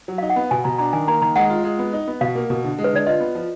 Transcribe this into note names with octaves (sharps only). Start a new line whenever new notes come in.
F#3
D#4 F5
F#5
B3
B2 G#5
B2 A#5
D4 A#5
D#3 G#5
A#3 A#5
D#3 A#5
G#3 F#5
F4
G#3
B3
D#4
B3
B2 F5
A#3
B2
D3
G#3
B4
D3 D5
F4 D#5
B3
F3